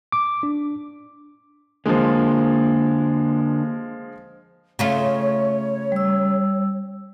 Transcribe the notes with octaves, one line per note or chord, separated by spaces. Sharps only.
D6
D4
D3 F3 G#3 A#3
C#3 A3 F4 C#5
G3 E6